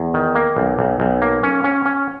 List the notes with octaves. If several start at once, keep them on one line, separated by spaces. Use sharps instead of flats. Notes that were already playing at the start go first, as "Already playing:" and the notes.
Already playing: E2
D#3
A#3
B1
B1
B1
A#3
C#4
C#4
C#4